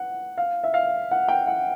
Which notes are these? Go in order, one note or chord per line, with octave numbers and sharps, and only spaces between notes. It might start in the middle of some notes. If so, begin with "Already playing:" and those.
Already playing: F#5
F5
E5
F5
F#5
G5
F#5